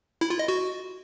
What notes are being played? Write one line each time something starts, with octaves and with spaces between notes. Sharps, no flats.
E4
F4
D#5
F#4